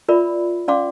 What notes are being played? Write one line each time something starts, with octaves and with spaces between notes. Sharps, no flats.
F4 A#4 D5 E5 B5
C#4 D5 F5 C6 D6